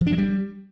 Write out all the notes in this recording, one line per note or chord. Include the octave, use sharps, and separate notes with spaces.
F3
D4
F#3
G3